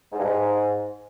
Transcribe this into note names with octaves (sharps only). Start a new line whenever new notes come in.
G#2
G2
G#2